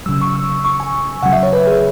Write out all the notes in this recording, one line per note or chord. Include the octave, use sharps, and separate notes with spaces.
C#3 F#3 E6
C#6
E6
C#6
G#5
C#3 F#3 F#5
E5
C#5
B4
G#4